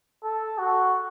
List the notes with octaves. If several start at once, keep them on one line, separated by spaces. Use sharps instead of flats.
A4
F#4